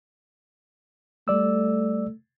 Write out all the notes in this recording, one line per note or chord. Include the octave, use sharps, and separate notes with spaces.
G3 A3 D5 E6